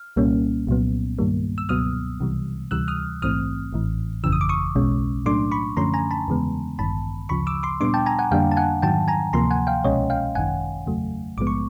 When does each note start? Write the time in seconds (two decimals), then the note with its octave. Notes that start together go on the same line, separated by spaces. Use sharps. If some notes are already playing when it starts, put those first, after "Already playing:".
Already playing: F6
0.16 C2 A#2 G3 A#3 C#4
0.67 C2 A#2 F#3 B3
1.19 G2 D#3 G3 A#3
1.58 E6
1.69 C#2 B2 F#3 B3 D#6 F6
2.20 C2 C3 E3 G3
2.71 D2 C3 E3 G3 E6 F#6
2.88 D#6 F6
3.22 A#1 G#2 E3 A3 C4 D#6 F6
3.73 A1 A2 E3
4.24 G1 F2 C#3 E3 E6
4.32 D#6
4.41 D6
4.49 C#6 D#6
4.75 B1 B2 G#3 C#4
5.26 A2 F#3 A3 D4 C6 D6
5.52 B5 C#6
5.77 F#2 D3 F3 A3 C#4 A#5 C6
5.94 G#5 A#5
6.11 A5 B5
6.28 E2 C#3 E3 G#3 B3
6.79 A1 G2 D#3 A5 B5
7.29 D2 C#3 F3 B5 C#6
7.47 D6 E6
7.63 C6 D6
7.81 A#2 G3 B3 D4 C6 D6
7.94 G5 A5
8.06 G#5 A#5
8.19 F#5 G#5
8.31 F2 D3 G3 A#3 D4 F5 G5
8.51 A5
8.57 F#5 G#5
8.82 G#2 D#3 F#3 G5 A5
9.08 G#5 A#5
9.33 D2 C3 F3 A#3 A#5 C6
9.51 F#5 G#5
9.67 F5 G5
9.84 C2 B2 G#3 C#4 C#5 D#5
10.10 F5 G5
10.35 G#1 F#2 D#3 F#5 G#5
10.86 E2 C#3 F#3 A3
11.38 A#1 G#2 F3 G#3 B3 D6
11.47 C#6